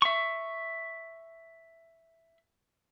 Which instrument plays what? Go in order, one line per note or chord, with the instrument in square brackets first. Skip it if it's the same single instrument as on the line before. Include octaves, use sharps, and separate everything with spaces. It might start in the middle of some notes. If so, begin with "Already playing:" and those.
[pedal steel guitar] E5 C#6